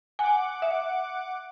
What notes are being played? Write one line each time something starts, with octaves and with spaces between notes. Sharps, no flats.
F#5 G#5 D6
E5